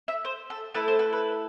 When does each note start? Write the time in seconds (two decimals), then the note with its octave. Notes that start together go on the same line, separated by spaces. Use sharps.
0.08 E5
0.25 C5
0.50 A4
0.74 A3 E4 A4 B4
0.88 C5
0.99 B4
1.13 B4